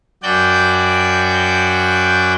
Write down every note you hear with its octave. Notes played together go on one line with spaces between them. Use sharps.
F#2 F#4 D5 G5 G6